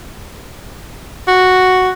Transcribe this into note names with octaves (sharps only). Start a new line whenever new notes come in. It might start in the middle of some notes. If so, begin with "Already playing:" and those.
F#4